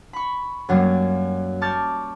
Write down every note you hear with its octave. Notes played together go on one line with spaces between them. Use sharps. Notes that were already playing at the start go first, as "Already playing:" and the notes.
B5 C#6
F#2 F#3 G3 A#3
A5 C#6 D6 F6 G6 A6